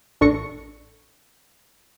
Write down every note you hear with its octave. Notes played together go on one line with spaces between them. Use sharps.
A1 D4 A4 C#6 A#6 C#7